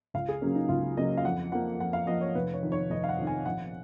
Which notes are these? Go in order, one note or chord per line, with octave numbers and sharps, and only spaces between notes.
C#2 F5
G#4
C#3 F#3 A#3 C#4
D#4
C#2 F4
C#3 F#3 A#3 D#5
F5
F2 F#5
F3 A#3 F#5
F2 F#5
F5
F3 A#3 D#5
C#5
F1 B4
C#5
F2 D#3
C#5
F1 D#5
F5
F#5
F2 D#3
G#5
A#1 F#5